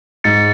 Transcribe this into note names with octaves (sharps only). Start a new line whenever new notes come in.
G#2 A6 C#7